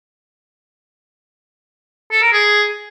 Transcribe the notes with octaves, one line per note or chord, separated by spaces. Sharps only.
A4
A#4
G#4